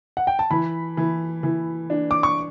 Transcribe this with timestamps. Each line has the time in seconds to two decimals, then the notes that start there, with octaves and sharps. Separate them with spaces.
0.17 F#5
0.27 G5
0.39 A5
0.50 E3 B5
0.97 E3
1.43 E3
1.90 D4
2.11 D6
2.23 C#6